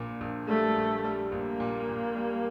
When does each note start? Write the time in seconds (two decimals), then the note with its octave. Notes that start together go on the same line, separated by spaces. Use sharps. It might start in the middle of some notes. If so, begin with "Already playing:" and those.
Already playing: A#1 A#2
0.21 A#1
0.48 G3 A3
0.76 A#1
1.04 G3
1.32 A#1 A#3
1.60 A#2
1.89 A#2
2.16 G3